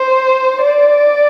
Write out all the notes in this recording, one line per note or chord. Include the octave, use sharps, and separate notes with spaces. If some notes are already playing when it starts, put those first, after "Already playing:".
Already playing: C5
D5